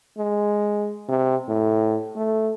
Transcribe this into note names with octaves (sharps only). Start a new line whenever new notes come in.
G#3
C3
A2
A3